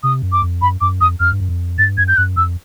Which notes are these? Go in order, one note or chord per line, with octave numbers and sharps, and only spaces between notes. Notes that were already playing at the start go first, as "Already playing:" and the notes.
C3 D#6
F#2
D6
F2
F#2 B5
F#2 D6
F2 D#6
F2 F6
G2
F#2
F2
G2 A6
F#2 G#6
G6
F#2 F#6
F2 E6